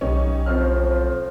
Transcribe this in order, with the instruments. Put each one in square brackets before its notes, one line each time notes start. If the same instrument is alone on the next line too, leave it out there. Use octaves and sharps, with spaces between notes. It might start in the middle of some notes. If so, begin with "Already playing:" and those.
[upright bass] B1 [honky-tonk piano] C#4 D#4 G4
[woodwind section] A2 F3 [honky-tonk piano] C4 F6